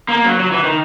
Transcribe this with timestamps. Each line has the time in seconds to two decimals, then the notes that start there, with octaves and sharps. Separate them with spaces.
0.09 A#3
0.25 F#3
0.40 F#3
0.52 E3
0.64 D#3